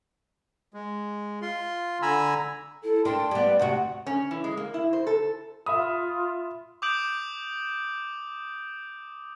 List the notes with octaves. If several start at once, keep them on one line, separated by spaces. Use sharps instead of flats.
G#3
F4 C6
D3 G#5 A#5 B5 E6
E4 A4
D4 A#4 G5 C6
G3 B3 D5
D2 C3 F#4 F#5
C#4
E3
G#3
A#3
E4
C5
A4
F4 E5 B5 D#6
D6 D#6 G6 D7 F#7